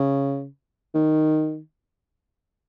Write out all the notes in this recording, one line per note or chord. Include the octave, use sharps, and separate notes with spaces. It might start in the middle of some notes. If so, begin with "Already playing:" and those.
Already playing: C#3
D#3